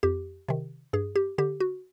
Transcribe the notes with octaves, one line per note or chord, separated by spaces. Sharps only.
F2 G4
C3 D#3
G2 G#4
G4
D3 G4
F#4